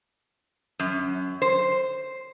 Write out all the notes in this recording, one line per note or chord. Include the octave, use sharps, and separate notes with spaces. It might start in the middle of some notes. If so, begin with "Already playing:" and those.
F#2
C5